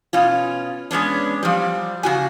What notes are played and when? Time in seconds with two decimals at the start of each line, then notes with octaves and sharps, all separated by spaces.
0.13 B2 C#4 F4
0.91 G#3 B3 C#4 D4
1.43 F3 G3
2.03 C#3 F#4 G#5